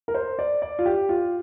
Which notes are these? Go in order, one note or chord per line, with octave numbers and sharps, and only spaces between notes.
A#4
C5
D5
D5
F4
G4
F4